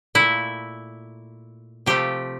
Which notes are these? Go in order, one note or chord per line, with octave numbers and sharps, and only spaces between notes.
A#2 A3 E4
C3 F3 A3 G4